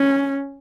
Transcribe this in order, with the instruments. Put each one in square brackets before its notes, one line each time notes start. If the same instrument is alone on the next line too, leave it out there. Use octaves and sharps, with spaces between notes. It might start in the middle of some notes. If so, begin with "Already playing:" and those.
Already playing: [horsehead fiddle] C#4